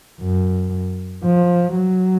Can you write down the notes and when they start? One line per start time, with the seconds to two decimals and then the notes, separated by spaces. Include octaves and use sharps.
0.21 F#2
1.25 F3
1.76 F#3